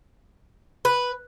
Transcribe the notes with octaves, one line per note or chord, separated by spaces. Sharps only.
B4